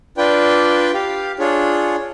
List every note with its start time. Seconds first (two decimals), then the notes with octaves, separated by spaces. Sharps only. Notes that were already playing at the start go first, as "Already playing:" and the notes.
0.18 D4 F4 B4 D5 G5
0.94 G4 F5
1.39 D4 F4 G#4 C#5